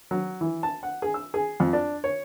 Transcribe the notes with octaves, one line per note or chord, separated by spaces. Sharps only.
F#3
E3
A5
F#5
G#4
E6
G#4
F2
D4
C#5